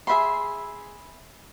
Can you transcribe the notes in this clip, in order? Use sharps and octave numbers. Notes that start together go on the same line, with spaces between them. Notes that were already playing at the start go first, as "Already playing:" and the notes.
G#4 E5 B5 C6